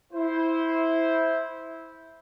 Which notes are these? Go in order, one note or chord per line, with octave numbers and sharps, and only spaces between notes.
E4 C5